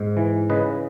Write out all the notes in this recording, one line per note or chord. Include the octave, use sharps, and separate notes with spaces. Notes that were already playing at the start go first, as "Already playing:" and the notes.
Already playing: G#2
E3
C#3 B4 D#5